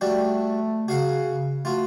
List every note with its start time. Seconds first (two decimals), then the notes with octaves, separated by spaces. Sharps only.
0.01 G3 A3 D4 F#4
0.88 C#3 F#4 F5 F#5
1.65 A3 F4 F#4